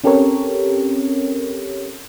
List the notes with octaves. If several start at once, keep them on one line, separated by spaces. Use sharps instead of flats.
C4 C#4 G4 A4 A#4 C#5